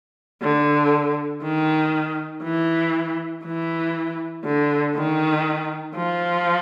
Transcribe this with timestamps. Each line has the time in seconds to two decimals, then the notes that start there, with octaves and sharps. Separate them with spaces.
0.42 D3
1.43 D#3
2.43 E3
3.44 E3
4.45 D3
4.95 D#3
5.95 F3